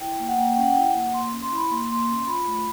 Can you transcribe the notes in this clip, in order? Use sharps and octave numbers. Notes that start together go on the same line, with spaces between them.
E4 G5
A#3
F#5
A#3 G5
F#5
C#4 G5
F#5
E4 G5
F#5
A#3
A#3 C6
C#4
C6
E4 B5
A#3 C6
A#3 C6
C#4
F4 B5
A3